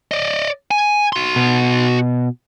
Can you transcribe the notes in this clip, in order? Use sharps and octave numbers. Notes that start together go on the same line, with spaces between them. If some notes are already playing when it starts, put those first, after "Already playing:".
D5 D#5
G#5
F#4 C6
B2